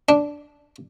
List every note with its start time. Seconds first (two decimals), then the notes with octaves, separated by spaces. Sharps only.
0.09 D4